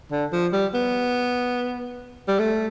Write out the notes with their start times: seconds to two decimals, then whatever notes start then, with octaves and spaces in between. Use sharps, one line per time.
0.12 D3
0.33 F3
0.53 G3
0.74 B3
2.28 G3
2.39 A3